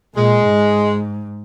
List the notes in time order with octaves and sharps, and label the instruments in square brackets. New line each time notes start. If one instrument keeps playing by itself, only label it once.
[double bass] A#2 [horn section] G#3
[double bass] G#2